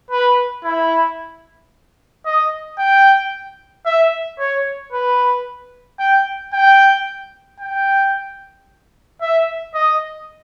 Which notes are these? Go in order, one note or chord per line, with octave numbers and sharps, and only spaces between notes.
B4
E4
D#5
G5
E5
C#5
B4
G5
G5
G5
E5
D#5